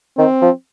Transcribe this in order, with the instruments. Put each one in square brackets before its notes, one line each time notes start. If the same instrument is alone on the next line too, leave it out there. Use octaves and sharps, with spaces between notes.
[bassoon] D#3 [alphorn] C4
[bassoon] F3